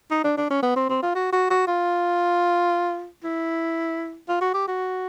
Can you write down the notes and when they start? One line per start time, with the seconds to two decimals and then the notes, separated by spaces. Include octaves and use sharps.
0.11 D#4
0.24 D4
0.37 D4
0.50 C#4
0.63 B3
0.76 C4
0.90 C4
1.03 F4
1.15 F#4
1.33 F#4
1.51 F#4
1.67 F4
3.24 E4
4.29 F4
4.41 F#4
4.54 G4
4.68 F#4